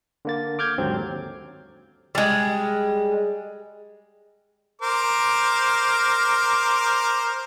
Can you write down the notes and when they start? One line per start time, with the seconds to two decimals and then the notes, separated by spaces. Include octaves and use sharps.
0.25 D3 A#3 A6
0.59 D6 F6 G6 G#6
0.78 D#2 G#2 D3 F#3 C4
2.15 G3 G#3
4.82 A#4 C5 D6